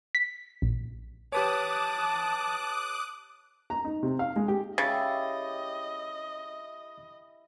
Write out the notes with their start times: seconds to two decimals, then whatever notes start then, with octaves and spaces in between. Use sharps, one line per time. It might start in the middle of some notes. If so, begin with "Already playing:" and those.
0.15 B6
0.62 A#1
1.32 G4 B4 C#5 A5 D6 D#6 F#6
3.70 A#5
3.85 D#4
4.03 C3
4.19 F5
4.36 G#3
4.48 G4
4.78 C#3 E4 G4 D#5 A6